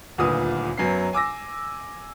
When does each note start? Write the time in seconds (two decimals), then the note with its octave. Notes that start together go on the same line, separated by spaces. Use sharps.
0.18 D#1 D2 A#2 B4 D#6
0.78 F#2 F#3 B3 C7
1.13 G#5 D6 E6 A#6